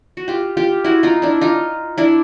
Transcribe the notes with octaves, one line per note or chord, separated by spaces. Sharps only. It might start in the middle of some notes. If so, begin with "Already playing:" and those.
F#4
F4 G4
F4 G4
E4 F#4
D#4 F4
D4 E4
D#4 F4
D4 E4